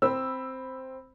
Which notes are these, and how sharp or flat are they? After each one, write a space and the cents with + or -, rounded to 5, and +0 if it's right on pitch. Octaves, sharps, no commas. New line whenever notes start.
C4 +0 B5 +0 E6 +0